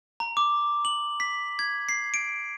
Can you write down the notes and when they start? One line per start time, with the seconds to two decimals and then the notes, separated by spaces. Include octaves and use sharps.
0.20 A#5
0.37 D6
0.85 F#7
1.20 B6
1.59 G#6
1.89 C7
2.14 D7